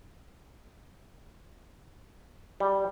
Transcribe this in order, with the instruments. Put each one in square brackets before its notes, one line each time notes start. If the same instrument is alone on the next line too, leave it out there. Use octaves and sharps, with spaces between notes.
[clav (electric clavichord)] G3